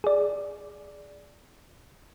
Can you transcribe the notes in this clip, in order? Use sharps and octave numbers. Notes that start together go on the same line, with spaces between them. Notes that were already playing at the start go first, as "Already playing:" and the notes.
G#4 D5